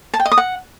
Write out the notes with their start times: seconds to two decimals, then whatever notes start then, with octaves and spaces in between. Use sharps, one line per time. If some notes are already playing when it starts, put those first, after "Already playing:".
0.14 A5
0.20 G5
0.26 D#5
0.32 D#6
0.38 F#5